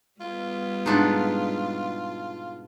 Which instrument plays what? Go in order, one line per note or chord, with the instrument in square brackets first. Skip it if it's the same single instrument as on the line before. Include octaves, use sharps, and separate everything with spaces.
[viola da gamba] G3 B3 [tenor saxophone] F4
[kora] G#2 F#5 [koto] B2 D4 D#4